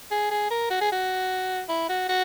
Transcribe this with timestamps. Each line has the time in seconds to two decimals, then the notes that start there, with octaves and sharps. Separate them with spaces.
0.11 G#4
0.31 G#4
0.50 A#4
0.70 F#4
0.81 G#4
0.92 F#4
1.69 E4
1.89 F#4
2.09 F#4